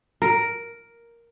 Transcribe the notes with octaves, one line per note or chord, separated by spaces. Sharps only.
A#4